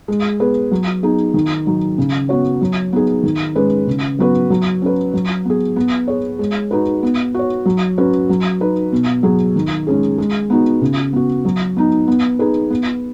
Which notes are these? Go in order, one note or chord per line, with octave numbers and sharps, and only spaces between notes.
G#3
B3 G#4 B4
F#3
B3 D#4 G#4
D#3
F#3 D#4
C#3
B3 F#4 C#5
F#3
B3 D#4 G#4
D#3
G#3 C#4 B4
C#3
F#3 B3 F#4 B4
F#3
C#4 B4
F#3
B3 G#4
B3
G#4 C#5
G#3
D#4 F#4 B4
B3
F#4 C#5
F#3
C#4 F#4 B4
F#3
D#4 B4
B2
F#3 B3 G#4
D#3
G#3 C#4 G#4
G#3
B3 D#4 F#4
C#3
B3 F#4
F#3
B3 D#4
B3
D#4 G#4 B4
B3